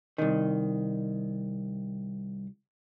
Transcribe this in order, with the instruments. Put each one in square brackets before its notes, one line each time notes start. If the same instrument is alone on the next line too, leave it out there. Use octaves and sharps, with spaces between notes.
[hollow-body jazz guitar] C2 D#3